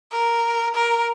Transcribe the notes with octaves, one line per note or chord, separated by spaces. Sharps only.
A#4
A#4